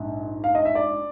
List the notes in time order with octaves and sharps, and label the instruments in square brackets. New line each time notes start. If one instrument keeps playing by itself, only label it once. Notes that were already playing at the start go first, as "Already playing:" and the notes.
Already playing: [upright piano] A#1 G#2
F5
D#5
E5
D5